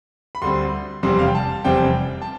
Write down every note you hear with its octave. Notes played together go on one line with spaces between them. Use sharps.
B5
D2 D3 G3 C4 C6
F1 E2 C3 G3 C4 C6
F5
G5
A5
F1 E2 C3 G3 C4 G5
A5